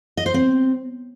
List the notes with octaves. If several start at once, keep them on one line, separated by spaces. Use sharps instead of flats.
D#5
C5
C4